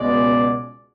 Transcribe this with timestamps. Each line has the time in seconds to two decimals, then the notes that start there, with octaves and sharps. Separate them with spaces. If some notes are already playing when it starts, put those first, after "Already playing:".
Already playing: C#2 B2 G#3 D5